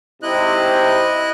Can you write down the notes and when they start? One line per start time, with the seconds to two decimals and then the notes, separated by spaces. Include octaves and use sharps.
0.23 G#2 C3 E4 D#5 F#6